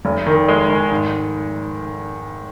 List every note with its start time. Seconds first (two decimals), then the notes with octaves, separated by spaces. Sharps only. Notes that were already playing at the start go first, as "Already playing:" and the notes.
0.05 F1
0.27 D#3
0.48 G#3
0.69 D#3
0.91 G#2